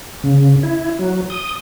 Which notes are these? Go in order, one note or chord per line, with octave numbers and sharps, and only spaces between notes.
C#3
E4
F#3
D#6